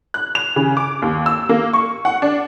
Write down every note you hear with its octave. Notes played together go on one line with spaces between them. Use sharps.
F#6
F7
C#3
D6
D#2
E6
A#3
C#6
F#5
D4